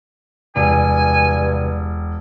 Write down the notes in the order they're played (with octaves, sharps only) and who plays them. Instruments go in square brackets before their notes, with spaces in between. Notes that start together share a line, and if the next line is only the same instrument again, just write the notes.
[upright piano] E1 [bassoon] G2 [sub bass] C3 [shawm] G#5